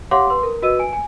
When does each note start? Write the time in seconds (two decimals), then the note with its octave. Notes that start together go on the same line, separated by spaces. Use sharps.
0.11 G4 C#5 F5 F#5 C6 D6
0.30 B4 C6
0.43 A#4
0.62 F#4 B4 D#5 E6 D#7
0.79 G#5 D7
0.93 G#5